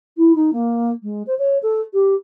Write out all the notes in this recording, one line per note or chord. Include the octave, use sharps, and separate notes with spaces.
E4
D#4
A#3
G#3
C5
C#5
A4
G4